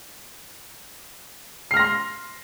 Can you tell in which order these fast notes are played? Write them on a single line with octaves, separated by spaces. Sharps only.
C7 F6 A#6 C6